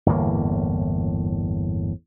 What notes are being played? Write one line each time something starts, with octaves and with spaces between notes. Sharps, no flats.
G1 E2 A2 A#3